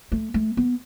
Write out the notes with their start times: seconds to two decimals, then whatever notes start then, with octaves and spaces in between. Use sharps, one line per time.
0.12 A3
0.34 A3
0.57 B3